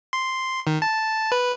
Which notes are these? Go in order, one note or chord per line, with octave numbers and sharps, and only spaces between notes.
C6
D#3
A5
B4